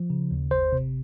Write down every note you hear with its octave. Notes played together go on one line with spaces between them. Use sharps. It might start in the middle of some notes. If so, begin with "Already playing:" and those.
Already playing: F3
C#3
D#2
G1 C5
C3